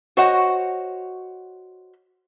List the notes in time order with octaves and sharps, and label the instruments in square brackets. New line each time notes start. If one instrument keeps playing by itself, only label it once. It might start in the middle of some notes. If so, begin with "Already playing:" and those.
[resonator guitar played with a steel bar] F#4 C5 C#5 D#5 F#5